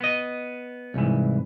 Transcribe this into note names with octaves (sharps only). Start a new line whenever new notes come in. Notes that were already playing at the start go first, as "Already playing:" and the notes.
B3 D#5
C2 G#2 E3